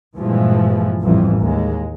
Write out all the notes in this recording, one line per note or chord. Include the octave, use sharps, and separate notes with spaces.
G2 A#2 E3 F3 G#3
A1 F2 E3 G3
D#2 G#3